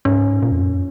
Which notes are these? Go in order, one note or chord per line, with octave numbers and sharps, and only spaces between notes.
G#2 C#4
A#2
F2
F#2